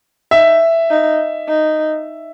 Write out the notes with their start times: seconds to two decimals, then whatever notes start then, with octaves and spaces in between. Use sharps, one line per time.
0.31 D#4 E5
0.90 D#4
1.48 D#4